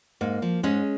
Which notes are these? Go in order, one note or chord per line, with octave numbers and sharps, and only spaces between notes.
G#2 A#3
F3
G#2 G#3 C#4